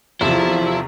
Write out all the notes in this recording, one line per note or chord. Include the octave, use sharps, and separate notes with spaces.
E2 C3 F3 E4 F4 A4